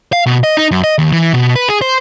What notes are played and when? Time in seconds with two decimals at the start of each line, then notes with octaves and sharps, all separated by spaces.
0.13 F5
0.26 B2
0.43 D#5
0.57 D#4
0.71 F#2
0.84 D#5
0.98 D#2
1.12 E3
1.33 B2
1.55 B4
1.68 G#4
1.81 C5